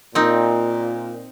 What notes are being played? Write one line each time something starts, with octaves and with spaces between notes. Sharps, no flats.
A#2 C4 D#4